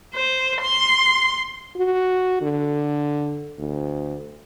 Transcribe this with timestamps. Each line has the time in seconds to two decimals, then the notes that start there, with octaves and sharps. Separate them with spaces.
0.15 C5
0.61 C6
1.76 F#4
2.41 D3
3.59 D2